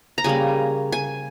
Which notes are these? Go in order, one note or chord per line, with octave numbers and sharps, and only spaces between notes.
A#5
C#3 G3 A#3 G#5
G#5